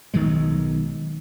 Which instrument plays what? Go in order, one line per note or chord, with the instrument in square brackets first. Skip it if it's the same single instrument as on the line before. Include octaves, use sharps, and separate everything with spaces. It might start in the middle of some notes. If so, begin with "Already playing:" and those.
[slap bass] B1 D#3 F#3 G#3